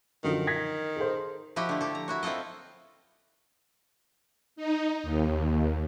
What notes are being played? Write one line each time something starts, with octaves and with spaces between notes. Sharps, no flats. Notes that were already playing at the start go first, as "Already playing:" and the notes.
F#2 D3 D#3 F3
G#6 A#6 B6
G#4 A4 C5
F3 E4 F#4 G4 D#5
D3 A3
G4 A4
A#5
E4 F#4 C#5
C4 E4 F4 A4 D#5
D#4
D#2